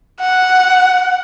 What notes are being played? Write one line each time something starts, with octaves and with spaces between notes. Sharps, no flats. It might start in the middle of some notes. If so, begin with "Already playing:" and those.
F#5